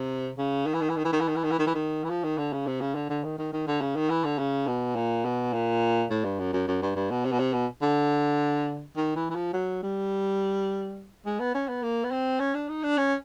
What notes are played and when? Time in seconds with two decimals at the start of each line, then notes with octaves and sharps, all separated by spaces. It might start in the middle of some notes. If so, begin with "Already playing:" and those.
Already playing: C3
0.38 C#3
0.66 D#3
0.74 E3
0.81 D#3
0.89 E3
0.97 D#3
1.05 E3
1.12 D#3
1.20 E3
1.28 D#3
1.36 E3
1.44 D#3
1.51 E3
1.59 D#3
1.67 E3
1.74 D#3
2.04 E3
2.10 F3
2.24 D#3
2.38 D3
2.52 C#3
2.67 C3
2.81 C#3
2.95 D3
3.10 D3
3.24 D#3
3.38 D#3
3.53 D#3
3.67 D3
3.81 C#3
3.95 D#3
4.10 E3
4.24 D3
4.38 C#3
4.67 B2
4.96 A#2
5.25 B2
5.53 A#2
6.10 A2
6.24 G2
6.39 F#2
6.53 F#2
6.67 F#2
6.82 G2
6.96 G2
7.11 B2
7.25 C3
7.32 B2
7.39 C3
7.53 B2
7.82 D3
8.97 D#3
9.16 E3
9.30 E3
9.35 F3
9.53 F#3
9.83 G3
11.26 G#3
11.40 B3
11.54 C#4
11.69 B3
11.83 A#3
12.04 B3
12.11 C4
12.39 C#4
12.54 D4
12.69 D#4
12.83 D4
12.97 C#4